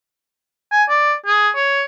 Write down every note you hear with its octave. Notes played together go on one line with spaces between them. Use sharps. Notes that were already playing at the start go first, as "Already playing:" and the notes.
G#5
D5
G#4
C#5